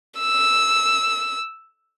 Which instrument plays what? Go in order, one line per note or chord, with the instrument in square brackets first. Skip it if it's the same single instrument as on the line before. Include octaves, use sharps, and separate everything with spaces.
[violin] E6